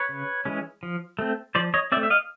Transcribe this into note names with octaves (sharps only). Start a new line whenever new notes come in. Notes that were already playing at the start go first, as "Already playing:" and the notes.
Already playing: B4 C#5
C#3
E3 G#3 C#4
F3
A3 C4
F3 C5 D5
C#5 D#5
A3 C4 D5 E5
E5
D#5 F5